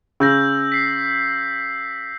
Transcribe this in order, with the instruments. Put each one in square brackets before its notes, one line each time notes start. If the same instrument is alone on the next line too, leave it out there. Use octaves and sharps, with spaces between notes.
[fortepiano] C#3 [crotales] E6 G6 A#6
[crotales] B6 C7